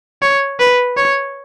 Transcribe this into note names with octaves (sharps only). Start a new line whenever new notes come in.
C#5
B4
C#5